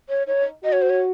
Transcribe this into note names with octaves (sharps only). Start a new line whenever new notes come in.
C#5
D#4 C#5
F#4 D#5
C#5
C5
C#5